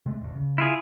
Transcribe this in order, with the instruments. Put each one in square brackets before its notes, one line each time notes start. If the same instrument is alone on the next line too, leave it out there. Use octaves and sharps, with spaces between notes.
[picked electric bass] C3 G#3 A3
E1 A1 D2
C#3
[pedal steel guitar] E4 F4 G#4